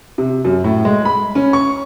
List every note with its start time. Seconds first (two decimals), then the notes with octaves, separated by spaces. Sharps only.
0.18 C3
0.45 F#2
0.64 A2
0.85 G#3
1.05 B5
1.35 C#4
1.53 C#6